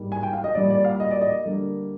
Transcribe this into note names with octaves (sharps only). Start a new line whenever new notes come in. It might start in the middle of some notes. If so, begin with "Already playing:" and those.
Already playing: G#2 G3 A#3
G#5
G5
F5
D#5
A#2 G3 A#3 D5
D5
F5
D#5
D5
D#5
D3 G3 A#3